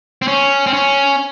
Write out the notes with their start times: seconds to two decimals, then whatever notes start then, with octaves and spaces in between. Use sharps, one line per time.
0.22 C4
0.28 C#4
0.67 C4
0.73 C#4